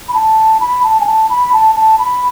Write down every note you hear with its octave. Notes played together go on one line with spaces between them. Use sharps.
B5
A5
B5
A5
G#5
A5
B5
A5
A5
B5